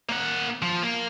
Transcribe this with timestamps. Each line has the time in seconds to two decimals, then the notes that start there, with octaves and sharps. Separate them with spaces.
0.09 A#3 F#5
0.62 F3
0.83 A#3